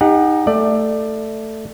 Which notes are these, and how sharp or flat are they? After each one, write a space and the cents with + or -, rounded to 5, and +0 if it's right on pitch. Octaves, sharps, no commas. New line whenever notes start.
D#4 +5 G4 +35 F#5 +0
A3 +5 D5 +20